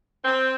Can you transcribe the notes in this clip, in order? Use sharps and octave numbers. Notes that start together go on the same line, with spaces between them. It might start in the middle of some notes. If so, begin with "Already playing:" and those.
C4